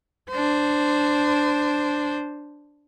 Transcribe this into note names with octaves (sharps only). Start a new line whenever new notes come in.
D4 C5